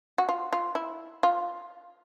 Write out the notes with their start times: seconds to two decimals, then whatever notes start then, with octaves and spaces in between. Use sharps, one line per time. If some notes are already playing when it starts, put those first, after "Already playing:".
0.18 F#4
0.29 F4
0.53 F4
0.75 E4
1.23 F4